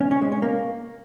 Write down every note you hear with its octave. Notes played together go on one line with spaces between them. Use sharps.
C#4
C#4
G#3
C#4
A#3